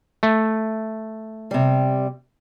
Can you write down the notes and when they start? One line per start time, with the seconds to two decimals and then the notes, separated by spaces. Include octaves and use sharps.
0.23 A3
1.51 C3 G3